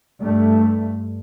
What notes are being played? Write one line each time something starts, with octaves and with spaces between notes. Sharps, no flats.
G2 A3